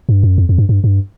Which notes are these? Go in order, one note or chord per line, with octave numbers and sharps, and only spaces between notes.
G2
F#2
F2
F2
G2
G2
G2